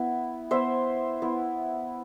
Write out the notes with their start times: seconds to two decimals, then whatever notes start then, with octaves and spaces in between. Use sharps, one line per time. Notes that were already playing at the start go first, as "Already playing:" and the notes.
Already playing: B3 E4
0.51 B3 E4 C5 E5
1.22 B3 E4